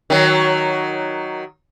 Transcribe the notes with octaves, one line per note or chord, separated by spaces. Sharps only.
D#3 F#3